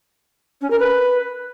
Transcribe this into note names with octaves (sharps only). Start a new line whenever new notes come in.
C#4
A#4
B4